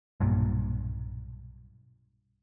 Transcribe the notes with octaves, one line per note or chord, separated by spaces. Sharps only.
B1 G2 A#2